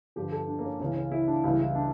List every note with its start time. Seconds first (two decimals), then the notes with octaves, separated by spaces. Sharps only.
0.16 G2 D3 F3 G4
0.32 A4
0.48 D4
0.59 A#3
0.65 C#4
0.80 C#2 C#3 E3 C#4
0.95 C#4
1.12 E4
1.27 D4
1.44 C#2 C#3 E3 G3 E4
1.60 E4
1.75 D4